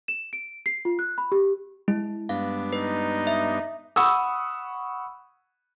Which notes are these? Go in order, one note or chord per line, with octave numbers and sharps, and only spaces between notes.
E7
D7
C7
F4
F#6
B5
G4
G#3 E4
G2 B3 D4 F5
D#4 B4
E5
F#5 B5 C#6 D#6 E6